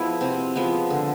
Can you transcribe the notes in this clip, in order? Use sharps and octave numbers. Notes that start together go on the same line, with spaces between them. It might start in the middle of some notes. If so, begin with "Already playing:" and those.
Already playing: F3 G#3 B3 E4
C3 C4
F3 G#3 B3
D3